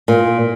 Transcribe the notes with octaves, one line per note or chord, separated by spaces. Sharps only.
A#2